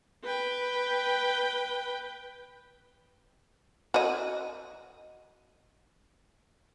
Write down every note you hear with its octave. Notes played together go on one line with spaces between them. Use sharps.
B4 G5
F#4 D#5